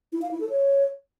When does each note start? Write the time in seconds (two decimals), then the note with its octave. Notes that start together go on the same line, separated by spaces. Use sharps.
0.13 E4
0.22 F5
0.31 E4
0.40 A4
0.50 C#5